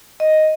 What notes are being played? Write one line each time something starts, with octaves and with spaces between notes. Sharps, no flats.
D#5